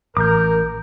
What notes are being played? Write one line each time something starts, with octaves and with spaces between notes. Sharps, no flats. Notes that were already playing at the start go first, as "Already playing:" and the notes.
A1 A#4 D6 G6